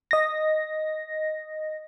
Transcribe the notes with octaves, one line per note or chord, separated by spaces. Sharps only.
D#5 A#6